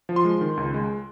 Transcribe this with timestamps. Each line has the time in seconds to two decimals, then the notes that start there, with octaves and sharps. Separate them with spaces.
0.09 F3
0.16 C6
0.25 G#3
0.41 D#3
0.57 C#2
0.74 G#3